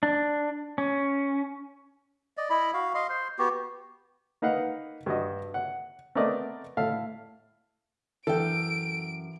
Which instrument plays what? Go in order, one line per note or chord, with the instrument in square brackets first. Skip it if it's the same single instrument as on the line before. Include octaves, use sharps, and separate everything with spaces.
[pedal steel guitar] D4
C#4
[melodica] D5 D#5
E4 D#5 B5
F#4 F5
D#5 F5 C6
C5 C6
B3 F#4 G4
[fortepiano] A#3 D#4 B4 F5 F#5
G2 F#4 D#5
F#5
A3 B3 C4 A#4 D5 D#5
A2 A4 E5 F5
[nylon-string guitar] F#2 G5 [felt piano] E3 [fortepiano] A4 [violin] D7